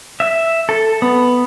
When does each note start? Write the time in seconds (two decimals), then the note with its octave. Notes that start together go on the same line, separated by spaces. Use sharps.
0.20 E5
0.69 A4
1.02 B3